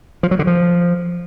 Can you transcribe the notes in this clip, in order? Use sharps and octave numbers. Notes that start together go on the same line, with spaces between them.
F3
F#3
D3
F3